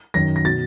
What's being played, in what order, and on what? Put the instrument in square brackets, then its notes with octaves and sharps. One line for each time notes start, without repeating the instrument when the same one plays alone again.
[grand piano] F#2 D#3 A#6
A#6
B2 A6